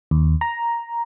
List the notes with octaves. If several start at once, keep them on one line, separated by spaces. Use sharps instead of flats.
D#2
A#5